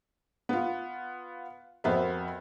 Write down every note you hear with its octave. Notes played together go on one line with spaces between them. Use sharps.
B3 F4
F2 B3 F#4 A#4 C5 E5